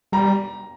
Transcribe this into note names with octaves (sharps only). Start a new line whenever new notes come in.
G3 A#5